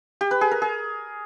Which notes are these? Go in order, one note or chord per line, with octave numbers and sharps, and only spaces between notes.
G4
B4
G#4
A#4
G#4